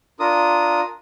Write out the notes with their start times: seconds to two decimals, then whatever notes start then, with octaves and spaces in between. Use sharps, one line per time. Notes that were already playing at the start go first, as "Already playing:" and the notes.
0.20 D4 F4 A#4 D#6